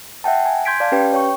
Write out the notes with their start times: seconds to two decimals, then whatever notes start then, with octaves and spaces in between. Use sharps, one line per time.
0.24 E5 F#5 G5 A5
0.46 G#5
0.65 C6 G6 G#6 B6 D7
0.80 D5 F5 A5
0.92 C#4 G4 B4 G5
1.13 C#5 G5 C#6